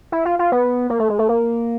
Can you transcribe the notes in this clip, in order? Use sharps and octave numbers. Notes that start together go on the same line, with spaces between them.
E4
F4
F4
B3
A#3
A3
G#3
A3
A#3